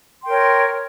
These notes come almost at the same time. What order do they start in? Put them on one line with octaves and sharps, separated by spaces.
C6 G5 A#4 C#5